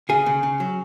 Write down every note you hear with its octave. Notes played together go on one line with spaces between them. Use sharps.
C#3 G#4
C#3
C#3
F#3